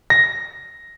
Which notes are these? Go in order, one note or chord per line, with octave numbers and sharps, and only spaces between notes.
A#6